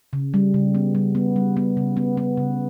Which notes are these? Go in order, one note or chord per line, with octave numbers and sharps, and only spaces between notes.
C#3
G3
C#3
B3
G3
B3
G3
B3
C#3
B3
B3
C#3